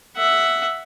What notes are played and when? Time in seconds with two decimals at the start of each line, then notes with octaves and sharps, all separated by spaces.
0.16 E5 F#5